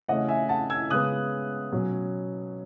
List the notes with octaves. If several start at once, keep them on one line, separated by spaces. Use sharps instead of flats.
C#3 E3 A3 C#4 D#5 F#5
E5 G#5
F#5 A5
E6 G#6
C#3 G#3 B3 D#6 F#6
B2 F#3 C#4